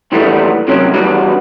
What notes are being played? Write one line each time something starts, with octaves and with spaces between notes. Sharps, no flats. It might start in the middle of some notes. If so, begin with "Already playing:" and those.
A#2 D#3 E3 G3 A3 B3
C3 D#3 F#3 A#3 C#4
E3 G3 B3 D4 F#4